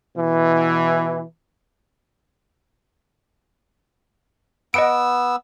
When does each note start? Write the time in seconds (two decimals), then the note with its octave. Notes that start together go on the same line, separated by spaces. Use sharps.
0.16 B2 E3
4.74 B3 D#5 F#5 E6 D7